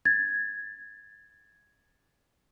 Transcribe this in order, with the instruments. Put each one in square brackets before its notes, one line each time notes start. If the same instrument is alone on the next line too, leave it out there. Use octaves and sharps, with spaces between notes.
[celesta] G#6 A6